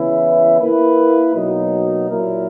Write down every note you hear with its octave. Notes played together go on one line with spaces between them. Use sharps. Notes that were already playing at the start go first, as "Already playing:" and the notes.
Already playing: C#3 E3 B3 E4
A#3 E4 B4
B2 F#3 A#3 D#4
A#2 F#3 A#3 E4 A#4